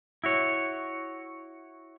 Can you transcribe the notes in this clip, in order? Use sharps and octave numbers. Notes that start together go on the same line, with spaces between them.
E4 F#4 C#5